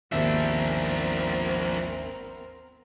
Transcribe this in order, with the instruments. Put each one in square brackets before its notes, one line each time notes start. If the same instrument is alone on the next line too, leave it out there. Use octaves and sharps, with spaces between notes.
[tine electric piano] G#1 D#2 E5 [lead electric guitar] F3 D4 [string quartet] B3 C4 A#4